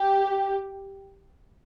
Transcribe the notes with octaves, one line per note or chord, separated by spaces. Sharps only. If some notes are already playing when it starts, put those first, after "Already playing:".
Already playing: G4